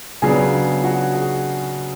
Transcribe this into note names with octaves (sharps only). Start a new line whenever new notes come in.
C#3 F#3 B3 D4 G#4
F#4
G#4